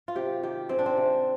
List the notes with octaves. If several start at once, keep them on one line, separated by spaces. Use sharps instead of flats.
F4
C3 G4
D#3 G4
G#3 C4
D4
C4
C3